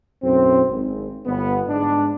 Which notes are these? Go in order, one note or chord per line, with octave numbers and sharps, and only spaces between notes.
B1 F#2 A2 C4
G#1
G1 B3
G#2 D4